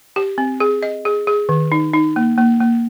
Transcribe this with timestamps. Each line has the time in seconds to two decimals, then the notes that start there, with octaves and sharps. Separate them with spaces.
0.16 G4
0.38 C4
0.60 G#4
0.83 D#5
1.05 G#4
1.27 G#4
1.49 D#3
1.72 D#4
1.94 D#4
2.16 A#3
2.38 A#3
2.60 A#3